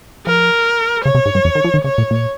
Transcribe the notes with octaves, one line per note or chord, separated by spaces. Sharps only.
F3 A#4
C#3 C#5
C3
G#2
G2
F2
D#3
F3
D#3
C#3 C#5
A#2
A#2